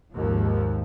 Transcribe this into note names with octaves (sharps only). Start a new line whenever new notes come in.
G#1 D#2 F3